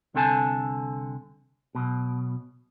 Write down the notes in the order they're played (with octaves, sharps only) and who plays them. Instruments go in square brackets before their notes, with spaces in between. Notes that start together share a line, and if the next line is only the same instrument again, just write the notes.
[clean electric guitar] C2 D3 C4 A4 G#5 A5
B1 B2